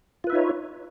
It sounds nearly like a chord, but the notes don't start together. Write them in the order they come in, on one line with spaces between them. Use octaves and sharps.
F4 B4 E5 D#4 C#5